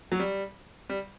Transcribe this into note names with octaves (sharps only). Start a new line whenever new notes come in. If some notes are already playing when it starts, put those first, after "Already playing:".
F#3
G3
G3